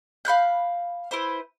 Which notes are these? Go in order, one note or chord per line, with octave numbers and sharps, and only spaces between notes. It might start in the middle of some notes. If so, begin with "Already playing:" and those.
F5 B5 F#6 G6
E4 B4 C5